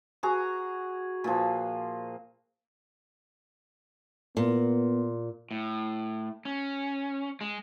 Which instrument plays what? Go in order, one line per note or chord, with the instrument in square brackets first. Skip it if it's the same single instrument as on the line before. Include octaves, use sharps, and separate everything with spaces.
[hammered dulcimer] F#4 G#4 A#5
A#2 F3
[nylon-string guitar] A#2 [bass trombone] B3
[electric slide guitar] A2
C#4
G#3